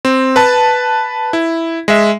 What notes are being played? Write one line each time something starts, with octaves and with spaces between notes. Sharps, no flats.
C4
B4 A5
E4
G#3 E5